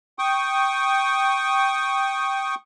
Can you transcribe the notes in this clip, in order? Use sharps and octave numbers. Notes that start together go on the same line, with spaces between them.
G5 C#6 D#6